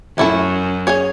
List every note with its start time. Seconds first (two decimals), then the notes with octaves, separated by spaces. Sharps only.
0.17 F#2 A3 E4 A4
0.87 C#4 G#4 C#5